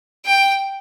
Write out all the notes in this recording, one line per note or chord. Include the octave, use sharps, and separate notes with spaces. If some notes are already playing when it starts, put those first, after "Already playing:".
G5